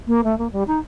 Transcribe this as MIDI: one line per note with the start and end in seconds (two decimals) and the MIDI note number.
0.07 0.21 58
0.24 0.37 57
0.38 0.48 58
0.52 0.63 55
0.67 0.79 63